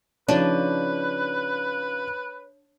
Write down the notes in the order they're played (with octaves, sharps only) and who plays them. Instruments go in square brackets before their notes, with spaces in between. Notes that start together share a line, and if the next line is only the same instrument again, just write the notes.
[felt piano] C#3 F3 D#4 [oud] D4 [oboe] B4 [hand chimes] C#5